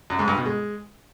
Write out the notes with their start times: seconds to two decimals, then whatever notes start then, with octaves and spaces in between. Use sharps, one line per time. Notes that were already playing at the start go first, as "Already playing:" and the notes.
0.10 F#2
0.19 G#2
0.28 G2
0.37 B2
0.46 G#3